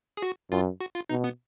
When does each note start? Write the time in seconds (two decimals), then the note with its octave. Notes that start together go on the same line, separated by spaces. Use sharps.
0.17 G#4
0.22 F#4
0.51 F#2 F4
0.81 F#4
0.95 F4
1.09 B2 D#4
1.24 B3